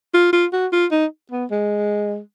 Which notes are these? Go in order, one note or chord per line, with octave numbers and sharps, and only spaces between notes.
F4
F4
F#4
F4
D#4
B3
G#3